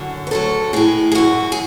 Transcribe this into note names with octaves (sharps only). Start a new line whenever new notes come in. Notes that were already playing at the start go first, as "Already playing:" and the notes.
Already playing: F#2 D3 F#3
B4
D2 D3 F#3 A4
A2 E3 G#4
G#4
F#2 E3 F#4
G#4